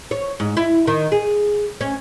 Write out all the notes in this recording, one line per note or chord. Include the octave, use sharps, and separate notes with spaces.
C#5
G#2
E4
D#3
G#4
C#4